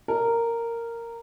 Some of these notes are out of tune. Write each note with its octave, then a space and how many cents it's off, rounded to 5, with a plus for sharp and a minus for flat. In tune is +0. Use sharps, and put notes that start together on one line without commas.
A#4 -10